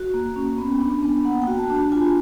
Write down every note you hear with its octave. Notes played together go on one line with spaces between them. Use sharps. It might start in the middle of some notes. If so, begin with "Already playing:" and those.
Already playing: F#4
A#3
C#4
B3
D4
B3
A#3 F#5
G5
F#4
A5
D4
A5
F4 G#5